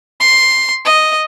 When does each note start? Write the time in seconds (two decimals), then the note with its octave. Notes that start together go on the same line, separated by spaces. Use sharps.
0.20 C6
0.85 D#5